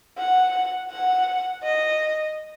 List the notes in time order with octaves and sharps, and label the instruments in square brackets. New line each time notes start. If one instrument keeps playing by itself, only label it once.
[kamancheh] F#5
F#5
D#5